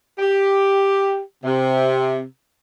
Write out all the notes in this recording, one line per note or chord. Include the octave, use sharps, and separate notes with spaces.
G4
C3